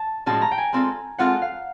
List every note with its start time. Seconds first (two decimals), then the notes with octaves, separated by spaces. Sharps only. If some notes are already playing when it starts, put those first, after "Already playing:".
Already playing: A5
0.26 A2 F3 G#3 C#4 F#4 A5
0.42 A#5
0.51 G5
0.58 G#5
0.73 G#3 C4 F4 A4
1.18 G#3 C4 F4 A4 F#5
1.42 F5